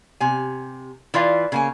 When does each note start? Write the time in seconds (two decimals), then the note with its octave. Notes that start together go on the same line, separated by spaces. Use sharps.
0.20 C3 G#5
1.14 E3 F4 D5 F5
1.52 C#3 A#3 G#5